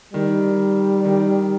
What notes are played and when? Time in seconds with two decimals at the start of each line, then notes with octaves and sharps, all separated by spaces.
0.13 D#3 G3
1.05 D#3